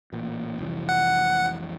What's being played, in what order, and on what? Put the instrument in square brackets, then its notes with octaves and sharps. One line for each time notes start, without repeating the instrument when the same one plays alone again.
[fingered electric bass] A1 A#2
F1 C2 E3
[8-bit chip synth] F#5